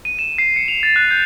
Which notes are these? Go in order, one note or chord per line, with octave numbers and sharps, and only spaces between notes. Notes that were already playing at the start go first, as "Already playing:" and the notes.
D#7
E7
C7
C#7
F7
A6
F#6
G6